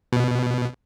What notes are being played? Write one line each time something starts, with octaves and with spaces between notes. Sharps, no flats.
B2